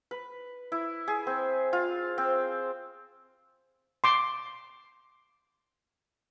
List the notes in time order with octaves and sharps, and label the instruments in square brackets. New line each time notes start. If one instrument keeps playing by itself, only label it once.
[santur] B4
E4
G#4
C4
F4
C4
[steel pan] C6 D6